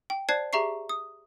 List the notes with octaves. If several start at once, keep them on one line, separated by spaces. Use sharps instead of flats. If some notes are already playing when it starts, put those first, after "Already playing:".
G5
C5 D5 A5 F#6 G#6 C7
G4 G#4 E5 A#5 C#6 C7
D#6